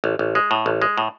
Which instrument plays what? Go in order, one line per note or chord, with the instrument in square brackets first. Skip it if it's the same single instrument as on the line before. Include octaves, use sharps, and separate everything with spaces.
[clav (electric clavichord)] A1
A1
G#3
A2
A1
G#3
A2